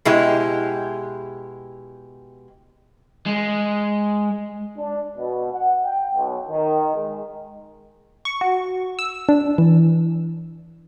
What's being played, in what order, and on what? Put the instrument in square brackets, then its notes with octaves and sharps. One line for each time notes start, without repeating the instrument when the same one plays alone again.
[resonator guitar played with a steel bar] B2 G#3 E4 G4
[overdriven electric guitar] G#3
[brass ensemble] D4
B2
F#5
G5
B1
D#3
G#3
[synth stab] C#6
F#4
E6
D4
E3